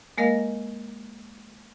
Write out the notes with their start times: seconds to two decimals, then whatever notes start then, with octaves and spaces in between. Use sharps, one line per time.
0.18 G#3 A#3 A#4 D#5 F5